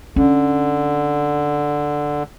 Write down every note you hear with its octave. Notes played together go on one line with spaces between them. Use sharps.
D3 C#4